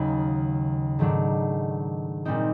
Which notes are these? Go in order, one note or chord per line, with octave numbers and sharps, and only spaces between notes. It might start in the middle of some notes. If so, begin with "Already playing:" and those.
Already playing: D#2 C#3 F#3
G#2 D#3 F#3 A3 D4
A#2 G3 C4 D#4